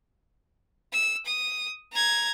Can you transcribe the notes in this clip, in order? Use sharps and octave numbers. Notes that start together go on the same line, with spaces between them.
E6
D#6
A#5 G#6